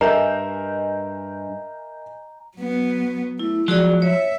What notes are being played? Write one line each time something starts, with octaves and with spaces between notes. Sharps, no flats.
G2 A#4 D#5 E5 G#5 A#5 G6
F#3 B3
A3 E4
F3 F#3 G#3 F#4 G#4 D5
C#5 E5